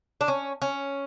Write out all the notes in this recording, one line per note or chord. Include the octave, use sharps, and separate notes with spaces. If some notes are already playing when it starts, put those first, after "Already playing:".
D4
C#4
C#4